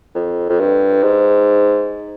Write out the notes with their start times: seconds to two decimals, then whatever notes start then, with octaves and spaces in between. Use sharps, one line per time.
0.15 F2
0.50 F2
0.60 G2
1.03 G#2